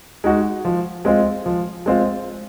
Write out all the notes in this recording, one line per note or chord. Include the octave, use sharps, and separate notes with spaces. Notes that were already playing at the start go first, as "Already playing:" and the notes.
G#3 D#4 F#4
F3
G#3 C4 F4
F3
G#3 C4 F4